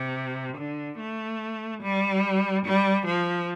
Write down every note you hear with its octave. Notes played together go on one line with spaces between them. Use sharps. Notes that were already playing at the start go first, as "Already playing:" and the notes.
Already playing: C3
D3
A3
G3
G3
F3